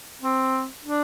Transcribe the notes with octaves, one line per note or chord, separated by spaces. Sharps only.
C4
D4